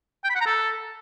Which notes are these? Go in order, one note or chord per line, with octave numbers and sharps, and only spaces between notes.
G5
B5
F#5
A#5
A4